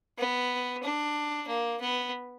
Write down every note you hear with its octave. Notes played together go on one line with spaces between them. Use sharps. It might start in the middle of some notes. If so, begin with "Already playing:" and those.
B3
D4
A#3
B3